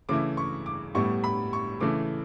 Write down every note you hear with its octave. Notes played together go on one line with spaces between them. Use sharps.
C#3 E3 A3 E4 D6
C#6
D6
A2 G3 B3 E4 C#6
B5
C#6
C#3 E3 A3 E4 D6